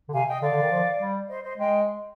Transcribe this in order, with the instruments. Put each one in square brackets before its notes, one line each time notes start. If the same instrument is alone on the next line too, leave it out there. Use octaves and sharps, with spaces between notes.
[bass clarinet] D3
[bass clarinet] C3 [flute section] F5 G#5
[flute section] D#5 G5
[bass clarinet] D3 [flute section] D5 F5
[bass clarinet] D3
D#3
F3
G3
[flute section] C5 D#5
C5 D#5
[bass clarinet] G#3 [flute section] D#5 G5